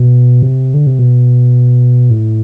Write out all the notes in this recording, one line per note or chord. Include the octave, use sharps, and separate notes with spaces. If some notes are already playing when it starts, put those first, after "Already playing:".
Already playing: B2
C3
D3
C3
B2
A2